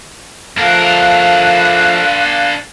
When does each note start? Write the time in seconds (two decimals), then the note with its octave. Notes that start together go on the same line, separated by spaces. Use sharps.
0.58 F3 A3 D4 A4 A#4 F5 F#6